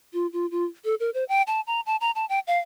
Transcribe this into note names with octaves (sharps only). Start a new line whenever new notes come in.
F4
F4
F4
A4
A#4
C5
G5
A5
A#5
A5
A#5
A5
G5
F5